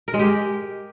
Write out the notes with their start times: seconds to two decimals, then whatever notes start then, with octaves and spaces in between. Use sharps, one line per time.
0.08 A#4
0.14 G#3
0.20 G4